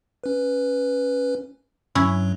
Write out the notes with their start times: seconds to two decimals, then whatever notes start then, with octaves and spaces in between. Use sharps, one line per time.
0.24 C#4 B4
1.95 G2 F#3 C#4 E4